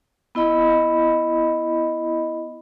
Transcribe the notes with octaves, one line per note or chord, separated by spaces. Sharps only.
B3 E4 D#5 B5